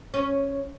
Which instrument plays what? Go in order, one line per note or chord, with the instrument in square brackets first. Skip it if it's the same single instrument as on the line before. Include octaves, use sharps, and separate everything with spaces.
[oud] C#4